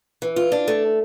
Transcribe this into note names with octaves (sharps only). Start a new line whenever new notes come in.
E3
F4
D4
A3